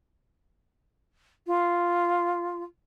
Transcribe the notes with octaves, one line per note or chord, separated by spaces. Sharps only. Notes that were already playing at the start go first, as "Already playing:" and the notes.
F4